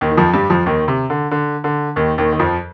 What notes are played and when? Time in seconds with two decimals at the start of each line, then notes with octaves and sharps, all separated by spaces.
0.01 D#2 D#3
0.11 D#3
0.17 F2 F3
0.34 G2 G3
0.50 F2 F3
0.66 D#2 D#3
0.88 C3
1.10 D3
1.31 D3
1.64 D3
1.96 D#2 D#3
2.18 D#2 D#3
2.33 D#3
2.39 F2 F3